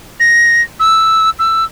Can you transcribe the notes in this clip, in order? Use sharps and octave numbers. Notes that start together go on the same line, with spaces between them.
A#6
E6
E6